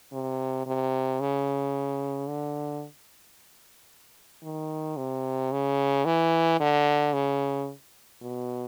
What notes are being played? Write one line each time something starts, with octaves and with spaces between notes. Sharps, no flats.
C3
C3
C#3
D3
D#3
C3
C#3
E3
D3
C#3
B2